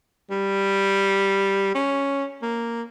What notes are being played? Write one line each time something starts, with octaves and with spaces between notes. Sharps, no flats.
G3
C#4
A#3